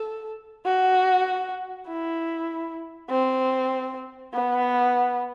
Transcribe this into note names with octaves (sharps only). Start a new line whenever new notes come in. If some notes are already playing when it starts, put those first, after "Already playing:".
Already playing: A4
F#4
E4
C4
B3